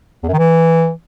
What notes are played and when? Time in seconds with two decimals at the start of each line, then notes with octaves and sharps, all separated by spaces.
0.23 E2
0.28 F#2
0.33 D#3
0.38 E3